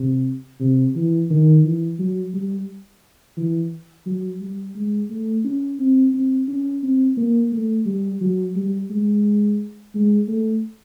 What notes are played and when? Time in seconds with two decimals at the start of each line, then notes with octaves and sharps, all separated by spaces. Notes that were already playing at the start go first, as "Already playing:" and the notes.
Already playing: C3
0.60 C3
0.96 E3
1.30 D#3
1.64 E3
1.99 F#3
2.34 G3
3.37 E3
4.06 F#3
4.41 G3
4.76 G#3
5.10 A3
5.45 C#4
5.79 C4
6.14 C4
6.48 C#4
6.83 C4
7.17 A#3
7.52 A3
7.86 G3
8.21 F#3
8.56 G3
8.90 G#3
9.95 G#3
10.28 A3